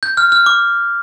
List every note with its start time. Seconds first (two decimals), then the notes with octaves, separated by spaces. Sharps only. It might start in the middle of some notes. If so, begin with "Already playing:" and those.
0.03 G6
0.17 F6
0.32 F6
0.46 D6